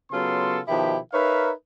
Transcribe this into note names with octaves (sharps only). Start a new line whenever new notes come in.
C#3 F#3 B3 F4 A4 C6
B2 D#3 F3 E4 G4
D#4 A#4 B4 C#5 E5 F5